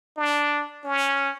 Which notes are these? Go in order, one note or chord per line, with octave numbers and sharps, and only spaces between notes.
D4
C#4